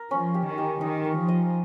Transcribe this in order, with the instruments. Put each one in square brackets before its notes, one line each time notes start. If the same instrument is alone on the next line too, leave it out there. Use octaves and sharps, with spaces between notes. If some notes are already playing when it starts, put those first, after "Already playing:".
Already playing: [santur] A#4
[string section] F3 [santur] C#4
[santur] G4
[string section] D#3
[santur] G4
[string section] D#3 [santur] D#4
[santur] A#4
[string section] F3
[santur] D#5